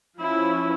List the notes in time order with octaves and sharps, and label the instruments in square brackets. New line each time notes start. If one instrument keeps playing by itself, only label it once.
[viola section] F3 C#4 E4